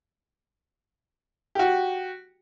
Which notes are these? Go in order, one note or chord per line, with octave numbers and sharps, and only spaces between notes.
F#4 G4